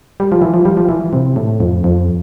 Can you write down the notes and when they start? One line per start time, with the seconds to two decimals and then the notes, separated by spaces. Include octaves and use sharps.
0.20 G3
0.32 F3
0.42 E3
0.54 F3
0.65 G3
0.77 F3
0.89 E3
1.13 C3
1.36 A2
1.60 F2
1.84 F2